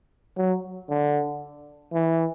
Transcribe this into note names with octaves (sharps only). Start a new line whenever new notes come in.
F#3
D3
E3